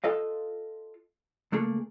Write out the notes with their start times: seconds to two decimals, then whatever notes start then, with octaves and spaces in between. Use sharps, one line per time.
0.04 F4 A4 D#5 F5
1.52 C#2 A3 A#3 G#4